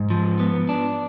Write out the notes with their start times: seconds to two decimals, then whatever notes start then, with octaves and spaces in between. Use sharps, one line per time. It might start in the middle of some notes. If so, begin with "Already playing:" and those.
Already playing: G#2
0.10 F3
0.40 B3
0.69 D4